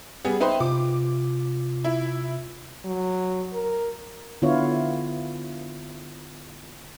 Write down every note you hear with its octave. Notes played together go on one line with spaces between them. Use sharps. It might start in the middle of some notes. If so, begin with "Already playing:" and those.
G3 B3 G#4
D#4 B4 C5 E5 G5
C3 F4 D6
E4
F#3
A#4
D3 B3 E4 F4 C#5